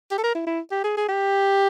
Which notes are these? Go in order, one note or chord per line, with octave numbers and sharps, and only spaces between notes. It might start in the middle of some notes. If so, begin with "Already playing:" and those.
G4
A4
A#4
E4
E4
G4
G#4
G#4
G4